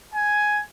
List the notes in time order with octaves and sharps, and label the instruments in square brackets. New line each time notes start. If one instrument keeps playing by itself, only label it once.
[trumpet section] G#5